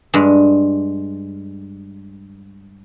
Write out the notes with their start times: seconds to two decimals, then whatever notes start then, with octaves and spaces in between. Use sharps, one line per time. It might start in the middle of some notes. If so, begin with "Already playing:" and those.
0.14 G2 G#3